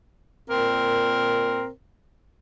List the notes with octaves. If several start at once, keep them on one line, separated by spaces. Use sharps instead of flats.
A#2 C4 A#4